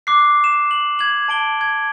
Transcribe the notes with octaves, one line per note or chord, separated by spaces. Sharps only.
D6 F#6 C7
E7
F#7
G#6 F#7
A5 D7 G7
G#6